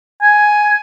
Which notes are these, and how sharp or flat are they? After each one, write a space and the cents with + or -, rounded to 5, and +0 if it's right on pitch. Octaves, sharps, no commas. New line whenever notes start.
G#5 +10